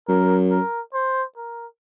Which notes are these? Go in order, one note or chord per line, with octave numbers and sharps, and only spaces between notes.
F#2 A#4
A#4
C5
A#4